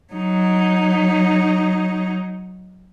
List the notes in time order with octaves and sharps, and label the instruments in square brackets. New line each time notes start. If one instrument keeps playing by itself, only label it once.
[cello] F#3 D#4